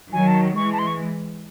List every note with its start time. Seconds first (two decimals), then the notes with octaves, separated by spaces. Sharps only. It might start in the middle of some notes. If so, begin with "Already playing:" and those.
0.13 D#3 F#3 G#5
0.27 A5
0.56 E3 G#3 C#6
0.73 A5
0.79 C6
0.87 C#6